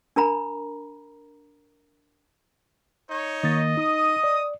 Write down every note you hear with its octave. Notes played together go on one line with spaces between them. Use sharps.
D4 A#4 A#5 B5
D#4 C#5
D#3 A#3 D#5 A6
D#4 D#6
D5